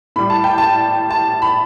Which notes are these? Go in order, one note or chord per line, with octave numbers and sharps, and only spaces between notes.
A2 G3 B5
A5
G5
A5
A5
B5